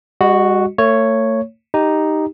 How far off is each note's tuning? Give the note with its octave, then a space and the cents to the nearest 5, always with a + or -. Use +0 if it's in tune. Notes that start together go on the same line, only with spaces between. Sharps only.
G3 +45 F#4 +0 D#5 +0
A3 +40 C#5 +0
D#4 +0 G4 +0